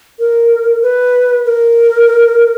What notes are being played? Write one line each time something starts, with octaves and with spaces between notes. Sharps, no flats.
A#4
B4
A#4